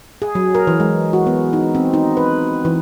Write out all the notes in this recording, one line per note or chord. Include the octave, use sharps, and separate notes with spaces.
G#4
F#3
A#4
E3
G#3
F#4
B3
D#4
C4
D#4
B4
E3